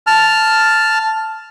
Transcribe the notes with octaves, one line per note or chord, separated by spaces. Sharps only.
A5 F6